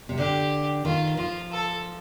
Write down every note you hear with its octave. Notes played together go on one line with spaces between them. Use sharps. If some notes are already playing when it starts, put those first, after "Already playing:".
C3
D3 G4
D#3 F4
F3 F4
A4